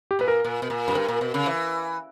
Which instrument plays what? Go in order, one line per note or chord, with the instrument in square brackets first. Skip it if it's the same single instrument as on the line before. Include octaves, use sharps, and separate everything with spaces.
[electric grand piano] G4
[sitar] A#2 [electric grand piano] B4
[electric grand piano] A#4
[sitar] A#2
B2
A#2
F#2
[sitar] G2 [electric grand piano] A#4
[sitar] A#2
B2
C#3
E3